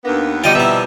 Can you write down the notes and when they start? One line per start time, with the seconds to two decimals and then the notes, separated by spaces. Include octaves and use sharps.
0.05 D#2 B3 D4 A#4 F5
0.44 C3 F3 G3 B3 F4 F#4 D#5 G5
0.55 B2 E4 E5 A#5